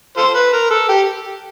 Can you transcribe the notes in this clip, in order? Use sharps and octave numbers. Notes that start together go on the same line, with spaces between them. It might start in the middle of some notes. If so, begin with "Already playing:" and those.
F4 A4 C5
B4
A#4
A4
G4